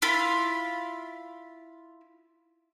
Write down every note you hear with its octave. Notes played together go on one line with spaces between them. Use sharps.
E4 F4 F5 B5